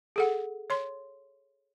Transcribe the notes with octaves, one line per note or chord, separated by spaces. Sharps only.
G#4 A4 F#5
C#5 C6